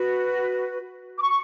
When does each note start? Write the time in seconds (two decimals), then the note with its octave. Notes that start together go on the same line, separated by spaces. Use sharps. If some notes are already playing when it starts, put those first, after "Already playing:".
Already playing: F#4 B4
1.17 D6
1.21 C#6